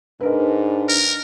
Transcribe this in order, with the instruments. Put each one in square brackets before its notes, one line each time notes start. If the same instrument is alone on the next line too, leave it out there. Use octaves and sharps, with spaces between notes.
[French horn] G#2 [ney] D4 [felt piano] D#4 A#4 B4
[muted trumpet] A#4